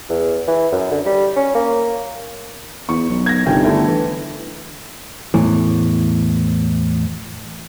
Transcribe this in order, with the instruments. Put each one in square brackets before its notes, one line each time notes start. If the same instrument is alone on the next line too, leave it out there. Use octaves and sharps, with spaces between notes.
[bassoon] E2
E3
F#2
D3
G3
C#4
A#3
[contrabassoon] E2 [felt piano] C#6
[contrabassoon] B1
[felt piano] G#6 A#6
[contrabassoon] G1 [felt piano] C3 D#3 G5
[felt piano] D3 A3 E4
[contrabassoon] E3
[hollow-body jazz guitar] E2 A2 E3